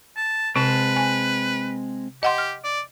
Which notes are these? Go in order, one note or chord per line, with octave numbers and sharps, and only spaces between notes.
A5
C3 G#3 C4 B4 A5
G#5
G4 D#5 F#5 C6
F6
D5